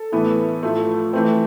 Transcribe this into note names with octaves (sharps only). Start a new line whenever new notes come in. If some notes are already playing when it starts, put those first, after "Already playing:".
Already playing: A4
A2 E3 B3
A2 F3 A3
E3 A3 C4